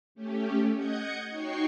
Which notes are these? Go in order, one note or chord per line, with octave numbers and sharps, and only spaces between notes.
A3 C#4 G4
D#5 F#5 G6 G#6 C#7
D#4 F#4 C#5 G5 C#6 C7